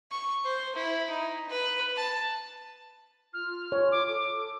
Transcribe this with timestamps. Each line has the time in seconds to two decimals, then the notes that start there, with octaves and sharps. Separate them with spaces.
0.11 C#6
0.44 C5
0.75 E4
1.10 D#4
1.49 B4
1.96 A5
3.33 F4 F6
3.72 C#5
3.92 D6
4.07 A4 D6